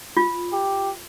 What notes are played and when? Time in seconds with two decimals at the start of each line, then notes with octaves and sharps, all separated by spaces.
0.17 F4
0.52 G4